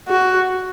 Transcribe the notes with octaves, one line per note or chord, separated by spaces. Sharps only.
F#4